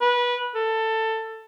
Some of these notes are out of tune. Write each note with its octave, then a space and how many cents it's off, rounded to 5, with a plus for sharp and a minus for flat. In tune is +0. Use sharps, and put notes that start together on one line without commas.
B4 -20
A4 +15